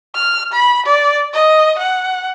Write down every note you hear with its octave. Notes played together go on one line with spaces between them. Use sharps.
F6
B5
D5
D#5
F#5